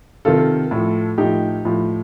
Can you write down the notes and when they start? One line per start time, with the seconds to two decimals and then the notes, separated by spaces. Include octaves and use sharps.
0.25 C3 D#3 F4 A4
0.71 A2 F3
1.18 A2 F3 D#4 G4
1.65 A2 F3